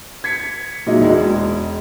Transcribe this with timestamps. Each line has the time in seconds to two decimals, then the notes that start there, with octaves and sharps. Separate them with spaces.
0.24 G#6 B6 C#7
0.87 A#2 F#3 G#3 D#4 E4
1.00 E1 G#3